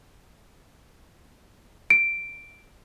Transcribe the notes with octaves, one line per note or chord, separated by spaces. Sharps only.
D7